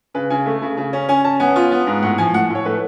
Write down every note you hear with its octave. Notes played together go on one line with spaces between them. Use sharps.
C#3 B4
C#3 G#5
A3
C#3
C#3
C#4
C#4 G#5
C#4 A5
B3 G#5
F4
B3
G#2
A2 F#5
F3 G#5
A2 F#5
A2 C#5
A3 B4